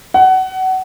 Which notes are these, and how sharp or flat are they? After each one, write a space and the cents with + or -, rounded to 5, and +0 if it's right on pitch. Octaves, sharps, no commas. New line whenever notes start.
F#5 +25